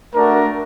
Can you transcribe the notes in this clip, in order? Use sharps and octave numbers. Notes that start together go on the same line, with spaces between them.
A3 D4 F#4 A#4